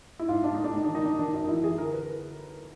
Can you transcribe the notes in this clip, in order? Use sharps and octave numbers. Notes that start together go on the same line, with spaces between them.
E4
G#2 F4
G#2 D4
A2 D#4
D4
A2 D#4
D#3 D4
D#4
D#3 D4
D#3 D4
F#2
D#4
E3 E4
E3 G#4
D3 A#4
B4